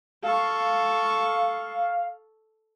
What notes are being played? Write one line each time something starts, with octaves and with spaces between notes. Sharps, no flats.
A4 F5 C#6